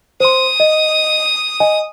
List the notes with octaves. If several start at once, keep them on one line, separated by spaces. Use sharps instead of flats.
C5 C6 D#6
D#5
D#5 G#5